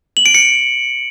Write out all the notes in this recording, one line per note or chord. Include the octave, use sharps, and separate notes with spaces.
F#7
D7
C#7